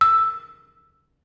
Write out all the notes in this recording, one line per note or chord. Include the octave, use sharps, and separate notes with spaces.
E6